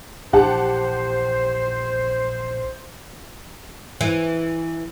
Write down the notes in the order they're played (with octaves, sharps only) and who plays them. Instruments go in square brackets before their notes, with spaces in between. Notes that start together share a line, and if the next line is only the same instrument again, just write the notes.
[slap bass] A#1 E3 [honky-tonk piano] G4 F#5 A5 [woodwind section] C5
[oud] E3